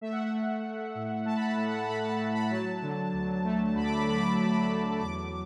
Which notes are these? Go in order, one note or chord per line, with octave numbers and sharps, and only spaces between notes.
A3 E5
F#5
E5
A3
A3
A2
A3 A5
B5
A5
A2 A5
F#5
A5
A2 B5
A5
A2
B5
F#3 A5
D3
D2
A3
D2 B5
D6
B5
D6
D3 B5
D6
B5
D2 D6
B5
D6
B5
F#3
E2 D6